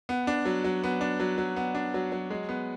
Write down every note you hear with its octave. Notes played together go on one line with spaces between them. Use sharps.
B3
D4
F#3
F#3
B3
D4
F#3
F#3
B3
D4
F#3
F#3
G#3
B3